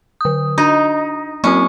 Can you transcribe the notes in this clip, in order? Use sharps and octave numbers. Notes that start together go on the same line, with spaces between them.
D3 D#6
D4 D#4
F#3 C4 C#4 F#4